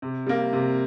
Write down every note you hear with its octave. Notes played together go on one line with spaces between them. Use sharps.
C3
G3 A#3
C3